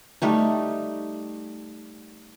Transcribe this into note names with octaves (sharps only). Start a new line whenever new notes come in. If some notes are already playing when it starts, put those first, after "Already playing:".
G3 A3 D#4